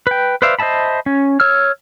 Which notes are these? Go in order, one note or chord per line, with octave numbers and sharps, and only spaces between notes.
B4 G5
B4 C5 D5 E5 F5
C5 D#5 E5 A5 B5
C#4
C#5 E6 F6